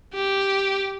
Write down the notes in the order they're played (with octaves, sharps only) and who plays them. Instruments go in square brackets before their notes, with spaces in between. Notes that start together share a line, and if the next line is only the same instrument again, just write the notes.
[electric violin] G4